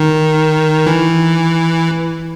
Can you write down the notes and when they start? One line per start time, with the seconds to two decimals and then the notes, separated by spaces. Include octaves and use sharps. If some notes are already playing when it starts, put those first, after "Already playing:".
Already playing: D#3
0.87 E3